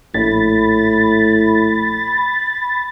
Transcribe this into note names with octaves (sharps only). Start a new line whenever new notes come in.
A#1 A2 B5 A6